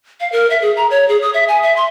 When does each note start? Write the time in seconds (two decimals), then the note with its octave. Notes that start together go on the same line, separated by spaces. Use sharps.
0.20 F5
0.32 A#4
0.50 E5
0.62 G#4
0.77 A#5
0.91 C#5
1.09 G#4
1.22 D#6
1.34 E5
1.48 G#5
1.63 E5
1.76 C6